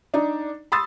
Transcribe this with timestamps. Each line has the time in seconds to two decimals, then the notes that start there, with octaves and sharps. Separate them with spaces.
0.14 D4 D#4
0.72 B5 C6 D#6 E6 A6